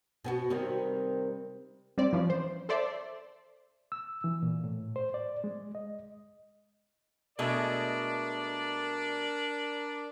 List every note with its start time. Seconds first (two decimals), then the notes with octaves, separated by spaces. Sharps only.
0.24 B2 B3 F#4
0.50 C3 D#3 G3
1.98 G3 C4 D5
2.13 E3 F3 C#4
2.30 C5
2.69 A4 C5 D5 E5
3.92 E6
4.24 E3
4.43 A#2
4.64 A2
4.96 C5
5.14 D5
5.44 G#3
5.75 D#5
7.39 B2 G#3 A3 D4 A#4 D5